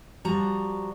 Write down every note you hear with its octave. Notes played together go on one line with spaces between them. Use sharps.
F3 G3 F#4 A#5